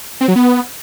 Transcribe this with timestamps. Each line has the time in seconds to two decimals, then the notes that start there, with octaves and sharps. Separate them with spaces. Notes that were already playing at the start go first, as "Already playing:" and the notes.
0.21 C4
0.28 F#3
0.36 B3